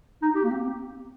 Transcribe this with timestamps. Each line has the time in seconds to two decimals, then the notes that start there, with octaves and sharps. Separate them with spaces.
0.22 D#4
0.35 G4
0.43 A#3
0.50 C4
0.64 C4